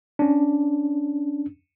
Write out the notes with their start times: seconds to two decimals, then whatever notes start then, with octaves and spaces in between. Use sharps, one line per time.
0.19 C#4 D4